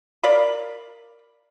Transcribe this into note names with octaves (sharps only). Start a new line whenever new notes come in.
A#4 D5 F5 B5